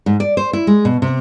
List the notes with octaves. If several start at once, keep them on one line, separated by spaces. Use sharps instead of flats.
G#2
D5
C5
E4
G#3
B2
C3